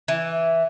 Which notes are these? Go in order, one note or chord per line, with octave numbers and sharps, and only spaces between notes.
E3